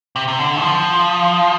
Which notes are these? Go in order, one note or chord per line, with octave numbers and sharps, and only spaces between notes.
C3
C3
D3
D#3
F3